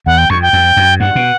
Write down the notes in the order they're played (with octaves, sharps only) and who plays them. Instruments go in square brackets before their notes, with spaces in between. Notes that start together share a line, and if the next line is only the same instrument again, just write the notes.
[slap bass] E2 [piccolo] F#5
[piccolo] G5
[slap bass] F2 [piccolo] C#6
[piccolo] G5
[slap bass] F2
F#2
[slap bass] G2 [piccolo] F#5
[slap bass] B2